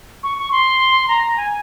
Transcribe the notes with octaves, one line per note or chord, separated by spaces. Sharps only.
C#6
C#6
C6
A#5
A#5
G#5